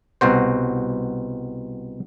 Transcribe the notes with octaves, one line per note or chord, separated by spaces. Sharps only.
C2 B2 F#4 C5